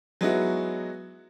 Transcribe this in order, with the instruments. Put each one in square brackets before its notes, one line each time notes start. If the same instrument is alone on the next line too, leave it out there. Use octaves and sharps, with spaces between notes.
[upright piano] F#3 G#3 B3 D#4 E4 F#4